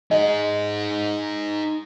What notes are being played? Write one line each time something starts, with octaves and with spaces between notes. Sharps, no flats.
D#4 G#4 D#5